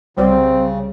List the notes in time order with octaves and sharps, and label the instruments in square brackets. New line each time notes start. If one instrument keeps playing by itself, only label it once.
[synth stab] C2 F#3 G3 [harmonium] C#3 [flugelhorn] C4